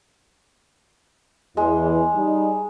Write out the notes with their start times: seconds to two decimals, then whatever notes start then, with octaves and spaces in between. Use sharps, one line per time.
1.57 E2 G#3
2.15 G3 D#4